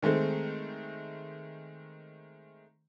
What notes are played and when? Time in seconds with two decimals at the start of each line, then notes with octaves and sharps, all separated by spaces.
0.02 D#3 G#3 A3 C4